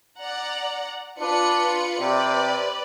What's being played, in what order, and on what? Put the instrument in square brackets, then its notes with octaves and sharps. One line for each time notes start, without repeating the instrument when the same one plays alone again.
[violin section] D5 F#5 A#5
[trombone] D4 [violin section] F4 B4 C#7
[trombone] C3 [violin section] B4 D5